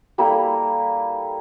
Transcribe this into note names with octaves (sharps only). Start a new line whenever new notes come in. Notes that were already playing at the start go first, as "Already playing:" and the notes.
G3 A#3 E4 A4